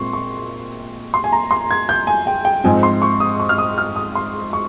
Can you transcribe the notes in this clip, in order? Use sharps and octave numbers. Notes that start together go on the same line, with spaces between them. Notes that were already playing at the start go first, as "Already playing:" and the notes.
Already playing: A#2 G#3 C4 C6 C#6
C#6
C6
G#5
A#5
C6
G#6
G6
G#5
G5
G5
G#2 F3 C4 G#5
C6
C#6
D#6
C#6
F6
D#6
F6
D#6
C6
C#6